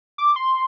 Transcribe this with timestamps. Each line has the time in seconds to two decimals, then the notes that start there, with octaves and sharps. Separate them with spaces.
0.18 D6
0.36 C6